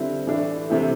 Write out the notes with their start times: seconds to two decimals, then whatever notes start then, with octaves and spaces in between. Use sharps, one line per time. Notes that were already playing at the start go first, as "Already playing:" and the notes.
Already playing: D3 G3 C4 E4
0.27 A2 E3 A3 D4
0.69 C3 E3 A3 C4 E4